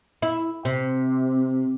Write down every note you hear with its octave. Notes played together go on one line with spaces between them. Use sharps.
E4
C3